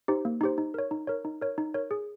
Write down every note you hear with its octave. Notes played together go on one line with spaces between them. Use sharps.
D#4 G4 C5
A#3
D#4 G4 C5
D#4
A#4 C#5
D#4
A#4 C#5
D#4
A#4 C#5
D#4
A#4 C#5
G#4